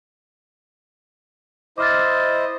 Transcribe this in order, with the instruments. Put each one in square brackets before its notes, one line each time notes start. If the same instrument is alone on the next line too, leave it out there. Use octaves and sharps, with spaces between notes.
[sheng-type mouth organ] E4 C5 D#5 [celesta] D6 F6 A6